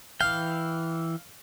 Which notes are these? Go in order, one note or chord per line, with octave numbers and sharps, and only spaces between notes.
E3 F5 G5